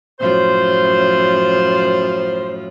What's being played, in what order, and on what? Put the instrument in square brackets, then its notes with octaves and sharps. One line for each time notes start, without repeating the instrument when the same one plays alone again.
[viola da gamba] F#2 A2 F3 [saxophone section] C5